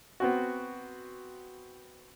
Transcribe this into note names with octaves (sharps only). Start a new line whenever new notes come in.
B3 C4 F#4